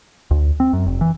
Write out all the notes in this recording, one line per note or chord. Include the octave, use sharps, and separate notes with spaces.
D2
C4
F#2
F1
E3